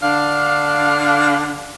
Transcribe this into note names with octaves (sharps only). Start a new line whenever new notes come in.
D3 D4 F5